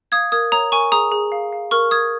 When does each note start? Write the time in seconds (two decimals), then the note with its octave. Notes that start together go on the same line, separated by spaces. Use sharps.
0.12 F5 D#6 G#6
0.32 A#4 D#6 G#6
0.52 C#5 A#5 D#6
0.72 A#4 G#5 C#6
0.92 G#4 A#5 D#6
1.12 G#4
1.32 F5
1.53 F5
1.71 A#4 C#6 F6
1.91 A#4 D#6 G#6